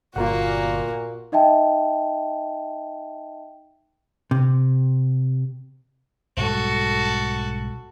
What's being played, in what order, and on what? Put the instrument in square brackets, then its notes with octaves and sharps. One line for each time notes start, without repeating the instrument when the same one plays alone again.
[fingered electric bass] G1 [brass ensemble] A#2 [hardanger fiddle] A#3 F#4 [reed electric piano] F4 A#4 F#5
[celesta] D#4 D#5 E5 G5 A5
[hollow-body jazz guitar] C3
[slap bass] B1 G#2 G3 [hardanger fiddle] F#4 A4